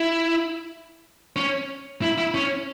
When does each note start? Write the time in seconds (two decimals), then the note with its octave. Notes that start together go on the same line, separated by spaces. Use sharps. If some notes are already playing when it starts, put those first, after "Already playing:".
Already playing: E4
1.36 C#4
2.02 E4
2.18 E4
2.34 C#4